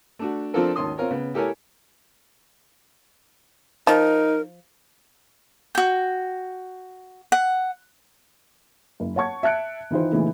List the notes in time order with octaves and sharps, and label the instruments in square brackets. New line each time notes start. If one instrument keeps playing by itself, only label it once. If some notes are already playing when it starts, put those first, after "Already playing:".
[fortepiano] A3 D4 F#4
F3 C4 D4 F4 A4 A#4
G#1 D#2 D#3 C#4 C6 D#6
C4 F4 A#4 C#5
C#3 B3
E4 G4 A4 A#4 C#5 G#5
[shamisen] F3 [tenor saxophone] D#4 [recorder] A#4
[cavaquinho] F#4 G5
F#5
[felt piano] F#1
C#5 F#5 A5 C#6 G#6
E5 A5 F#6 C#7 D7
D#3 E3 D#4 F4 C5
A#2 C#3 E3 A3 D#4